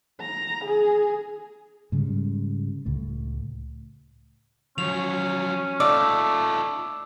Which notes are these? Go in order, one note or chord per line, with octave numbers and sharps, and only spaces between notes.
A#5
G#4
G#2 C#3 G3
C#2 A2 A3
F3 F#3 C#4 F7
A3 D#4 F4 D5 D6 E6